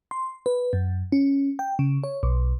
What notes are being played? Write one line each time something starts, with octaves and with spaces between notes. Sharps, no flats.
C6
B4
F#2
C#4
G5
C#3
C#5
B1